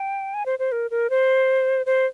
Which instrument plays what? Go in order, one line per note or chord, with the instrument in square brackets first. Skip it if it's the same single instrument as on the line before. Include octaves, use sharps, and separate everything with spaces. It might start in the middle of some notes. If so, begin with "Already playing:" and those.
Already playing: [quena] G5
G#5
C5
C5
A#4
A#4
C5
C5